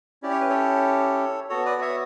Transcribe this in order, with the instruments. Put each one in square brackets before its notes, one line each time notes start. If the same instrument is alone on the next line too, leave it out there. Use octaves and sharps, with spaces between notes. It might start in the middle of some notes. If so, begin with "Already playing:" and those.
[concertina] C#4 E4 G4 D5
C#5
B4
A4 C#5
B3 F#4 A4 C#5
B4 D5
C#5 E5